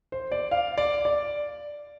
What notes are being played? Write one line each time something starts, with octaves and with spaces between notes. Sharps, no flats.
C5
D5
F5
D5
D5